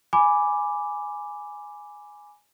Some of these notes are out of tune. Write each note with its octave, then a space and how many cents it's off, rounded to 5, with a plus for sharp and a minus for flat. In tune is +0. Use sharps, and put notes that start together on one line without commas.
G#5 +0 B5 +0 D6 -5